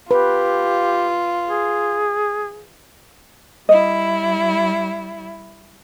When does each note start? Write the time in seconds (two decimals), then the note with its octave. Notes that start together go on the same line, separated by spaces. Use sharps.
0.11 F4 G4 B4
1.46 G#4
3.69 G3 E4 D#5